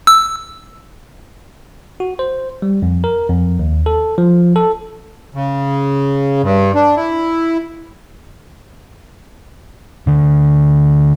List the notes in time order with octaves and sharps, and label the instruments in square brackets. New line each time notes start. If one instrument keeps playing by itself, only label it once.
[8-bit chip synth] E6
[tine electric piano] F#4
C5
G3
F2
A#4
F2
D#2
A4
F3
A4
[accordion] C#3
G2
D4
E4
[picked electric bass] D2 D3